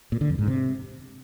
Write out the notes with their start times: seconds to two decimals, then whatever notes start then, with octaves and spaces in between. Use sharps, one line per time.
0.12 A#2
0.21 D3
0.30 F2
0.39 G#2
0.48 C3